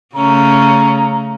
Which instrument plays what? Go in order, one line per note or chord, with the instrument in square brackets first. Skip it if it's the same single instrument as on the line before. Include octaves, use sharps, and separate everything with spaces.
[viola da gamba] C#3 A3 C#4 [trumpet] A#5